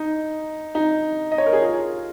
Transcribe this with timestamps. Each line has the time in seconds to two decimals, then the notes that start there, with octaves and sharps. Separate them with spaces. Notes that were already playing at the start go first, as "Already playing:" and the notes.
Already playing: D#4
0.75 D#4
1.32 D#5
1.38 C#5
1.46 A#4
1.53 G#4
1.60 F4